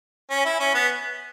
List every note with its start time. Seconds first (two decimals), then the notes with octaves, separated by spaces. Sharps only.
0.30 C#4
0.45 E4
0.60 C#4
0.74 B3